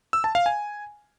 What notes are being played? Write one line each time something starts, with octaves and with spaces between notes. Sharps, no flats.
E6
A5
F5
G#5